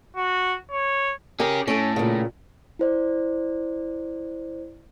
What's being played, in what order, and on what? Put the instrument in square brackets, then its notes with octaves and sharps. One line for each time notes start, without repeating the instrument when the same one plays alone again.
[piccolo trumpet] F#4
C#5
[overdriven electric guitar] C#4 G#4 [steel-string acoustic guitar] G4 A#4
[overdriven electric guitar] A2 [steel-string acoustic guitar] C#4 A4
[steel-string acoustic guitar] A#2 C#3
[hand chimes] E4 C5 D5